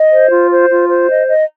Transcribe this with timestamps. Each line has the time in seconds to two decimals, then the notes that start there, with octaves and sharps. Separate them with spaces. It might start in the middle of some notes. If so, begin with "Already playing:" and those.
Already playing: D#5
0.11 C5
0.30 F4
0.50 C5
0.69 F4
0.88 C5
1.09 D#5
1.27 D#5